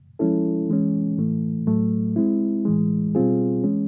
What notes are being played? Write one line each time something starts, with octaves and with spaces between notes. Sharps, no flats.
F3 G#3 C#4 E4 A4
E3 G#3 C#4
A2 E3 A3
A2 F#3 A3
G#3 C4 E4
A2 E3 G#3
B2 G3 C4 F4 G#4
E3 G#3 C#4